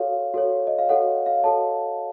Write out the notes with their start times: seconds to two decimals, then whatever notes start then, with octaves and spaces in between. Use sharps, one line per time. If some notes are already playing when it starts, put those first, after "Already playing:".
Already playing: F#4 A4 C#5 F5
0.34 F#4 A4 C#5
0.67 D#5
0.78 F5
0.89 F#4 A4 C#5 F#5
1.26 F5
1.44 F#4 A4 C#5 A5